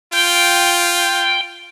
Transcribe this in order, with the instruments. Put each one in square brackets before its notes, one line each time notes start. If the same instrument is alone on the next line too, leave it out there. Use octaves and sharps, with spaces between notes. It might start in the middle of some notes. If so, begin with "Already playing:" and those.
[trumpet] F4 [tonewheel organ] G5